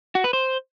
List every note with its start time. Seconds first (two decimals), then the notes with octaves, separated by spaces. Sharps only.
0.15 F#4
0.24 B4
0.33 C5